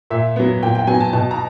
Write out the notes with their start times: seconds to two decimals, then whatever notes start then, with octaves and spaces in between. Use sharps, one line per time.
0.10 A#2 E5
0.36 F#3 B3
0.62 A#2 G5
0.75 G5
0.87 F#3 B3 G#5
1.00 A5
1.13 B2 A5
1.31 A#5